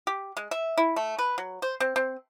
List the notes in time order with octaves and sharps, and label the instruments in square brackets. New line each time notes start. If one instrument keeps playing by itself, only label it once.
[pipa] G4
G#3
E5
E4
A3
B4
F#3
C5
C4
C4